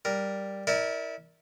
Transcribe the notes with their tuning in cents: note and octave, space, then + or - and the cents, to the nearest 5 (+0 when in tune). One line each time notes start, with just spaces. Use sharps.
G3 +0 A#4 +0
E4 -25 A#4 +0 D5 +0